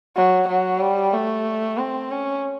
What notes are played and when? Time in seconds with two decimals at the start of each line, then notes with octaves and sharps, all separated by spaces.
0.15 F#3
0.48 F#3
0.80 G3
1.13 A3
1.78 C4
2.10 C#4